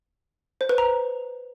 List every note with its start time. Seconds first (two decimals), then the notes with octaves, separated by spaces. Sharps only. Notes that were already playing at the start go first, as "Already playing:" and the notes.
0.61 C5
0.69 B4
0.78 A#5